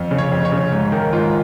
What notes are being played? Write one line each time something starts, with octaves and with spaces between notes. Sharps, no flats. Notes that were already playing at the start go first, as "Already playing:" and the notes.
Already playing: F2
C#3
C#5
F2
C#5
C#3
G#2
D#3 A#4
G#2 F4